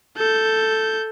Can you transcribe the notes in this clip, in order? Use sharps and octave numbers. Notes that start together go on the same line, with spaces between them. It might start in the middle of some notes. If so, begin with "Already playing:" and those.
A4 G6